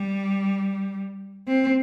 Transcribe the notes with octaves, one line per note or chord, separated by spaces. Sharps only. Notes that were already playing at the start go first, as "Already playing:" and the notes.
Already playing: G3
C4